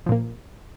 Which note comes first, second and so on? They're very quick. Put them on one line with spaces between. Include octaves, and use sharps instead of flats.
F3 A#2 A#3